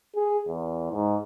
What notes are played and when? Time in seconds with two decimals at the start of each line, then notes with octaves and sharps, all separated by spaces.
0.15 G#4
0.47 E2
0.92 G#2